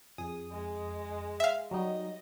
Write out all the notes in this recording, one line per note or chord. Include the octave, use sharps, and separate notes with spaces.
F2 G#4 D#6
G#3
E5 F5
F#3 G3 D#4 D#5